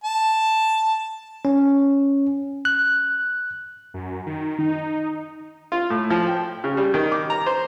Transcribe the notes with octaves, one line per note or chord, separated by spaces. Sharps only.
A5
C#4
F#6
F#2
D#3
D#4
F4
A2
F3
G5
C#3
G3
D#3
D6
A#5
C5